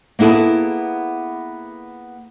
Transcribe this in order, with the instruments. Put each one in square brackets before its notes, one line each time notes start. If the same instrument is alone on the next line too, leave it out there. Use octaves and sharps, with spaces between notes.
[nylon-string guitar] A#3 B3 E4 G#4 A4